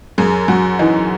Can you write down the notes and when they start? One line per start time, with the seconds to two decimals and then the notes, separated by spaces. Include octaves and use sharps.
0.18 F#2 G#4
0.48 F#2 F#4
0.79 E3 D#4